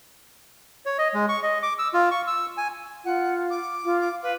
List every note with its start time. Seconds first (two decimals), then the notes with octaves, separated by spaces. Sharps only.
0.86 C#5
0.98 D#5
1.14 G#3
1.29 C#6
1.43 D#5
1.63 D6
1.79 E6
1.94 F4
2.11 C#6
2.27 E6
2.57 G#5
3.04 F4 F#5
3.50 D6
3.85 F4
4.00 D6
4.22 B4 F5